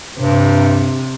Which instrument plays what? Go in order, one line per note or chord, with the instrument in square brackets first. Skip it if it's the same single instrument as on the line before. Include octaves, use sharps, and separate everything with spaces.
[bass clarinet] G2 [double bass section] C3